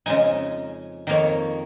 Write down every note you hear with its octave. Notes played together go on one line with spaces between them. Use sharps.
F2 C#3 G#3 D#4 G#5
F2 D#3 A#3 C#5